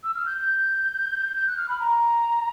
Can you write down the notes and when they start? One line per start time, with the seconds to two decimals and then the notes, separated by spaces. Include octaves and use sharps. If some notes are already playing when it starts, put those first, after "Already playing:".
0.04 E6
0.14 F6
0.26 G6
0.37 G6
1.35 G6
1.47 F#6
1.57 F6
1.69 B5
1.80 A#5